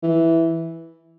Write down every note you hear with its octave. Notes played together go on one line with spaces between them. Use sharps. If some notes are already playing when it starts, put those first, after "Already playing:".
E3